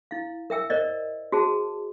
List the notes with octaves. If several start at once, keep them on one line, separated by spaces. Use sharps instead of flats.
E4 F5
A#4 E5 G5 E6
A#4 C5 D5 D#5
F#4 G#4 C5 A5